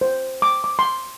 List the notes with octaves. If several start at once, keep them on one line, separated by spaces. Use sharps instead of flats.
C5
D6
D6
C6